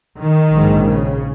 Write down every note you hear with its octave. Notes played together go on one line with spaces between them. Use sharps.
D#3
A#1 G#2
C#3